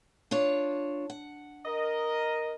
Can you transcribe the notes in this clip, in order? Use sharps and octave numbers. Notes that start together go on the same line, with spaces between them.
D4 F4 C#5
F#5
A#4 D#5